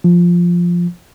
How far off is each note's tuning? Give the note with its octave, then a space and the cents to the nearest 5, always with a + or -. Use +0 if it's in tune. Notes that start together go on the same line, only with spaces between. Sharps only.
F3 +0